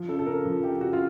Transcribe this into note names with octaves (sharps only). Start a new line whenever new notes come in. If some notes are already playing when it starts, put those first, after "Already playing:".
Already playing: F3
C#3 A4
A4
C#3 A#4
F3
C#3 G4
C#3 F#4
F4